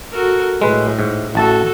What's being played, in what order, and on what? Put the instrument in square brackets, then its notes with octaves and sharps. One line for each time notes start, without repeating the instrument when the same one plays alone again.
[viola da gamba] F#4 A4 A#4
[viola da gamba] A2 [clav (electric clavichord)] G#3 B4
[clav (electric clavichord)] G#2
[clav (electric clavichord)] A1 A5 [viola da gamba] F#4 A4